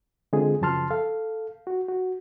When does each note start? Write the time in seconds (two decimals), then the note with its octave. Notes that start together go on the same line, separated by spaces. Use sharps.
0.33 D3 G#3 C4 F4 G#4
0.61 F#2 C#3 F3 A5 C6 F6
0.90 A4 F5
1.67 F#4
1.89 F#4